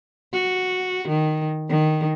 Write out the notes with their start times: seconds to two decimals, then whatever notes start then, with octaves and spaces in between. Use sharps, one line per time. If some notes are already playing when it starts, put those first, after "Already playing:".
0.33 F#4
1.08 D#3
1.69 D#3